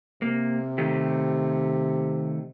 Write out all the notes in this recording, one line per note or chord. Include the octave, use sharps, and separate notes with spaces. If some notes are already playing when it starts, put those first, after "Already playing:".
C3 A#3
D#3 A3 G4